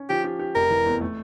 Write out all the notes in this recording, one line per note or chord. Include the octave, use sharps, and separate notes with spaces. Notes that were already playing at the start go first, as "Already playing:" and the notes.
Already playing: C#4
F3 G4
G4
G4
F1 A#4
E3
E2
A3